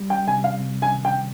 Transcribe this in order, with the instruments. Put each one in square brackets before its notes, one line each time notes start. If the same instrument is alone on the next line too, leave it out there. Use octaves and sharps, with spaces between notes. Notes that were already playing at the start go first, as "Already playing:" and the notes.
Already playing: [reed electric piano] G3
[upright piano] G5
[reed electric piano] C3 [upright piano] G#5
[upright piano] F5
[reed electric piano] C3
[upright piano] G#5
[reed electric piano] D#3
[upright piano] G5